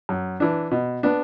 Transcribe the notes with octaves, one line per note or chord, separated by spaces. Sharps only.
F#2
E3 D4
B2
B3 D4